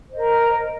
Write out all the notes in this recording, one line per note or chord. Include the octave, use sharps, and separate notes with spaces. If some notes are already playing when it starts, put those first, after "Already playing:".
A#4 C5 D#5 A#5